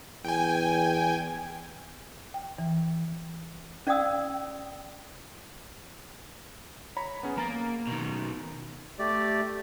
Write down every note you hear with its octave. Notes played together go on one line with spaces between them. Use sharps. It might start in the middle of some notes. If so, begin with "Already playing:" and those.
E2 G5 G#5
G5
E3
C#4 D5 F5 G5 D#6 E6
C#5 A#5 B5
B3 C#4 G#4
A#3 A#5 A6
B2 D#3
A3 G4 D5